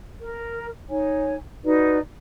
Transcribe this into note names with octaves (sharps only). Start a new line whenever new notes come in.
A#4
D#4 C#5 G#5
D#4 F#4 B4 D5